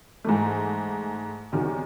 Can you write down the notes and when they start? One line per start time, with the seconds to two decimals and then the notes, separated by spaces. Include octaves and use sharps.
0.24 G#2 E3 A3
1.52 E2 C3 D#3 F#3